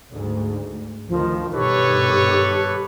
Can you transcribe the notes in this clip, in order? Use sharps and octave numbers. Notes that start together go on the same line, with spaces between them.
D2 G#2
D2 D#3 F3
G2 B2 D#3 G4 A4 B4 C#5